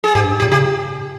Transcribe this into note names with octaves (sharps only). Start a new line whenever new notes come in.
G#4
G#2 G4
G2
G#2
G4
A#2
C#3 G4